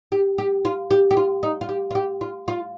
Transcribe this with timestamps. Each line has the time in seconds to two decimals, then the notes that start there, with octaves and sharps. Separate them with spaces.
0.12 G4
0.38 G4
0.65 F4
0.90 G4
1.11 G4
1.17 F4
1.43 D#4
1.61 F4
1.69 G4
1.91 F4
1.95 G4
2.21 F4
2.48 F4